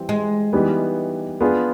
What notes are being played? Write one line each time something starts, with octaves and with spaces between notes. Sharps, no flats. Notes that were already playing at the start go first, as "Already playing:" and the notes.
Already playing: E3 G3 C4
G#3
E3 G3 B3 D#4 G4
B3 D4 F4 G#4